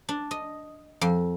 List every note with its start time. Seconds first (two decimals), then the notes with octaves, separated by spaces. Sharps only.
0.09 D4
0.31 D#5
1.01 F2